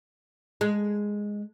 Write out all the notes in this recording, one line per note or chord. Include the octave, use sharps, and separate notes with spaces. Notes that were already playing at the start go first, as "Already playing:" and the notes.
G#3